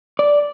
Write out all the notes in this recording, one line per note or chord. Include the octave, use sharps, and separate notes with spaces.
D5